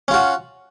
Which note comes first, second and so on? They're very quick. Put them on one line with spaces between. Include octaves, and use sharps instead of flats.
C#4 F4 F#4